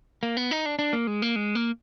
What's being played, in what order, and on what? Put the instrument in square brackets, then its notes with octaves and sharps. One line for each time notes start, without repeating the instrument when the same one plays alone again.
[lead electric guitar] A#3
B3
D#4
D4
D4
A#3
G#3
A#3
G#3
A#3